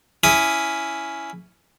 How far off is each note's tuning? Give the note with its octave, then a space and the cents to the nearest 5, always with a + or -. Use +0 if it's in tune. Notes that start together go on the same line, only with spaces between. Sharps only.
C#4 +5 E4 +0 D#6 +0